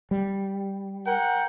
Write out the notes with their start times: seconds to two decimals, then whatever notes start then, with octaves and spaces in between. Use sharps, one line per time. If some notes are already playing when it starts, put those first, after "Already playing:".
0.11 G3
1.05 A#4 F#5 G5